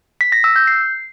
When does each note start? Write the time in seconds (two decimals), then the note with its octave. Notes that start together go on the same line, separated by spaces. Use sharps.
0.21 B6
0.32 A#6
0.44 E6
0.56 G6
0.67 C7